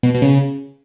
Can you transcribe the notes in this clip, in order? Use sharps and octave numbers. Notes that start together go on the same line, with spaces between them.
B2
B2
C#3